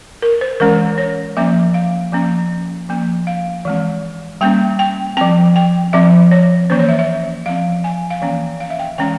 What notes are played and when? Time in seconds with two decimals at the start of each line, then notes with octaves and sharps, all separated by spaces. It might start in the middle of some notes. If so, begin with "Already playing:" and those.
0.22 A#4
0.41 C5
0.60 E3 G#3 C#4 A#4
0.98 C#5
1.37 F3 A#3 C#4 E5
1.74 F5
2.12 F3 A#3 C#4
2.89 F3 A#3 C#4
3.27 F5
3.65 E3 G#3 C4
4.41 G3 A#3 C#4 G5
4.79 G5
5.17 F3 C4 G5
5.56 G5
5.93 F3 C4 E5
6.31 C#5
6.70 E3 A#3 C#4 C5
6.79 C#5
6.89 E5
6.99 E5
7.46 F3 C4 F5
7.84 G#5
8.10 F5
8.22 E3 A#3 C#4 G5
8.60 F5
8.70 E5
8.79 G5
8.98 E3 G#3 C#4 G5